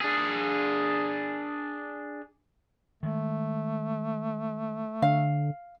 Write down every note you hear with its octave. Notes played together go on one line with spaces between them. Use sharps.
D4 G#4
D#3 G#3 A3
D3 F5